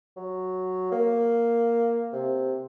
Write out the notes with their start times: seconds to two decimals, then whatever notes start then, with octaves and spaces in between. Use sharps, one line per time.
0.17 F#3
0.92 A#3
2.13 C3